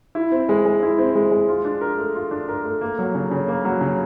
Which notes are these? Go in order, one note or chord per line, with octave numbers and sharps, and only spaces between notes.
E4
C4
G#3
G#3
E4
C4
G#3
G#3
F4
D4
A#4
A3
F4
D4
A#4
A3
A#3
F#3
C#3
C#3
A#3
F#3
C#3